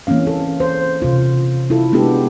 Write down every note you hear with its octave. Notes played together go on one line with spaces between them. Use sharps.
E3 A#3 C4 C#4 F5
A4
C5
C3 F4
E4 F4 A4
G#3 B3 D4 G4 A4